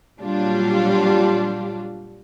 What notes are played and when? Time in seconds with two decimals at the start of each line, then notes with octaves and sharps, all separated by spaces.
0.19 A#2 F#3 G3 D4 F4